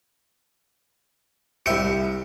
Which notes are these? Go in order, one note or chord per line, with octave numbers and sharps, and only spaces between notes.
C2 G4 C5 E5 C#7